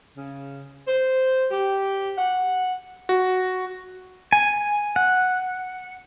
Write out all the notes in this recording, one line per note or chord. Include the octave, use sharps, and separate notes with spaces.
C#3
C5
G4
F#5
F#4
G#5
F#5